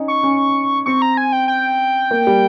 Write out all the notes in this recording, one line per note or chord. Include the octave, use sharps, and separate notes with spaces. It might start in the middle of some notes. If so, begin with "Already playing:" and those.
Already playing: C#4 D#4
C#6
C#4
C4 C#6
A#5
G#5
G5
G5
A#3
G3